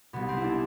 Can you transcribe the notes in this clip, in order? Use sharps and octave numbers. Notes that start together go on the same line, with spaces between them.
C2 B2 B3
C4
E4
D4